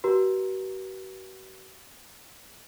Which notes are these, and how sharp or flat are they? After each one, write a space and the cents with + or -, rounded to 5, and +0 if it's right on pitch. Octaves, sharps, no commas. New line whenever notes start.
F#4 +45 B4 -40 A#5 +0